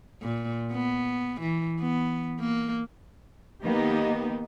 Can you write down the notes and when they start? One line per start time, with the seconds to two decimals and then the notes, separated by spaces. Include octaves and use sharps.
0.22 A#2
0.72 B3
1.41 E3
1.80 B3
2.40 A#3
3.63 D#3 A#3 B3 D#4 G4